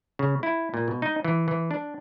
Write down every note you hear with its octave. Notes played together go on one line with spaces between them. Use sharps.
C#3
E4
A#2
B2
D#4
E3
E3
D4